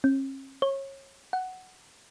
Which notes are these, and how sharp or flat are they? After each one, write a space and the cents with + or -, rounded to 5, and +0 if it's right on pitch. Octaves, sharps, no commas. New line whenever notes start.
C#4 -45
C#5 -30
F#5 +5